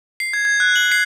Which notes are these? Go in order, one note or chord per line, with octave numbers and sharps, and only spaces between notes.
C7
G#6
G#6
F#6
F#7
C7